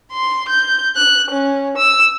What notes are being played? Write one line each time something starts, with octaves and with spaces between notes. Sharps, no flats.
C6
G6
F#6
C#4
E6